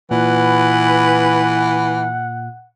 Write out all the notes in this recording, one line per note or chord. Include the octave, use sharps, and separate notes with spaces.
A#2 E3 B4 F#5